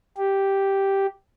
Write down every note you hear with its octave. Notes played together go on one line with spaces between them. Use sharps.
G4